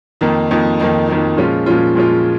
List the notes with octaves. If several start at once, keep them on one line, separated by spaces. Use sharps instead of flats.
F2 D#3 A#3 D#4
F2 D#3 A#3 D#4
F2 D#3 A#3 D#4
F2 D#3 A#3 D#4
A#2 F3 G#3 C#4 F4
A#2 F3 G#3 C#4 F4
A#2 F3 G#3 C#4 F4